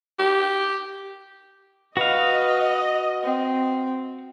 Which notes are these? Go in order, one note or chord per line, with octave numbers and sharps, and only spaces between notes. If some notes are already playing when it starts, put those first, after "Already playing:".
G4
F#4 B4 D#5 F5
C4